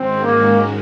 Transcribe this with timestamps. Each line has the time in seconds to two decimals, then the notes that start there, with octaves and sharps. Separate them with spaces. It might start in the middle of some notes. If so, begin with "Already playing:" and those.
Already playing: G#2 D#3 G#3 C4 C#4 F#4
0.24 A#3